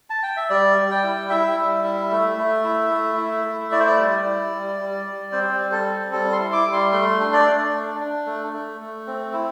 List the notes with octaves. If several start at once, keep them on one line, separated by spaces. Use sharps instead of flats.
A5
G5
E5
G3 D5
G3
G5
E4
E4 E5
G3
E4
A3
A3
E4
A3
E4
A3
E4 D5
C5
D5
G3
E4
G3
G3
G3
C4 C5
G3
A4
C4
G3 A4
C6
E4
D6
G3
C6
A3 C6
D4
D5
A3
D4
D4
A3
A3
A3
C4
E4